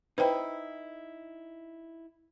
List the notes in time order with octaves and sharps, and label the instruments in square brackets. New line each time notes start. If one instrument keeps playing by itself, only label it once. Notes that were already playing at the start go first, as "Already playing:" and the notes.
[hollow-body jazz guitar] D#4 E4 [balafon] B4 C5 G5